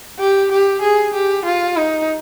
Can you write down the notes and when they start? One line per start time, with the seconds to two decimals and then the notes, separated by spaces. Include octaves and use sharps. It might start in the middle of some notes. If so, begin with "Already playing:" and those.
0.19 G4
0.51 G4
0.81 G#4
1.13 G4
1.45 F4
1.76 D#4